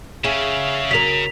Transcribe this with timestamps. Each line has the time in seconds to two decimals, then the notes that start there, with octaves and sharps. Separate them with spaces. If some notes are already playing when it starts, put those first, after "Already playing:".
0.24 C#3 G#4 C#5 E5 F5
0.91 F#3 A#4 B6 F7